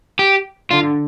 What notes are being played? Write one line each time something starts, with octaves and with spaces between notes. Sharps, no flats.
G4
D3 F4